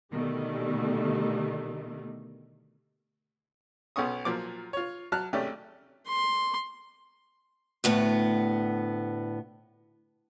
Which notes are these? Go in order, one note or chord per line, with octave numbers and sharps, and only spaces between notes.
B2 D3 D#3 G3 A3
B1 B3 C#4 C#6 D#6
A#2 F3 F#3 D6
F4 C#5
F#3 A5 F6 F#6
G#1 A3 C#4 G4 D5
C6
D2 A2 B3